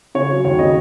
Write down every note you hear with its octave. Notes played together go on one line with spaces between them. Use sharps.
C#3 C#5
F#3
D#2 C#5
C#3 D#5